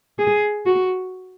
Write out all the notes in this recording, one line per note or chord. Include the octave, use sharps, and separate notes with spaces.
G#4
F#4